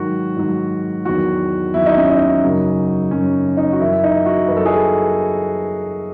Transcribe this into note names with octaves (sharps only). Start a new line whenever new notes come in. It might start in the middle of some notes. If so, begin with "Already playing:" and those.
Already playing: G#2 D#3 F#3 F#4
G#2 D#3 F#3
E2 D#3 F#3 F#4
E2 D#3 F#3 E4
D#4
C#4
D#4
F#2 C#3 F#3
F#2 C#3 F#3 C#4
D#4
F#4
F#2 E3 E4
D#4
F#4
F#2 E3 B4
A4
G#4
A4